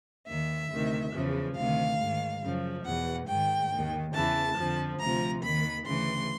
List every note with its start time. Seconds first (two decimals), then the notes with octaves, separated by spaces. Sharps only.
0.28 D#2 D#3 E5
0.70 D2 C3 D#3
1.13 E2 C#3 F3
1.57 D2 C3 D#3 F5
1.99 G#2 D#3
2.42 F#2 C#3 F3
2.85 E2 B2 F#5
3.28 G#2 D#3 G5
3.71 D#2 D#3
4.14 E2 C#3 E3 A5
4.56 F2 D3 F3
5.00 D2 C3 F3 A#5
5.42 D#2 D#3 B5
5.86 D2 C#3 E3 C6